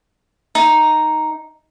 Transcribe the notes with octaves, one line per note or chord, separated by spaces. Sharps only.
D#4